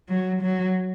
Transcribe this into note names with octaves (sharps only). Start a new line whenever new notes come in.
F#3
F#3